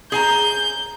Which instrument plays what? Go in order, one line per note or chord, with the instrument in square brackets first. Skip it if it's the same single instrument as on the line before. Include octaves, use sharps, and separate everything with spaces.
[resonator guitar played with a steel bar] G#4 G#5 A#5 [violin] G6